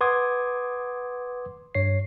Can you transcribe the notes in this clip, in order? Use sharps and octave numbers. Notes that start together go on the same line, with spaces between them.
B4 F#5 C6 D6 D#6 G#6
G2 C#5 C7